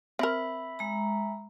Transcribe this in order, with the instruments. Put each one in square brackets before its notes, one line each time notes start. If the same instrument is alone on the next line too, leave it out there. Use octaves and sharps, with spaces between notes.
[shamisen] C4 A#4 [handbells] E5 B5
[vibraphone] G#3 A#5